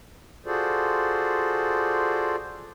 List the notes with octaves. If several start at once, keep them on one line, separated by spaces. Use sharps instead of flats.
F4 F#4 G#4 A4 C5 D5